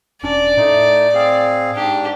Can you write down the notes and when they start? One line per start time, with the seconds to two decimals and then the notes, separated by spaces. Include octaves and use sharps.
0.23 E1 C#4 D4 D5
0.57 A2 A3 D#4
1.14 C4 G#4 F5
1.76 G#2 D4 G4